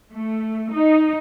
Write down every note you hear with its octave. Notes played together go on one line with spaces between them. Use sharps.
A3
D#4